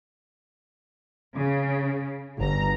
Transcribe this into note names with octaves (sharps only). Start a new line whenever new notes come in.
C#3
G1 A#5